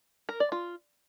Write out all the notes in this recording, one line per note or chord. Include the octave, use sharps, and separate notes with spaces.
A#4
D5
F4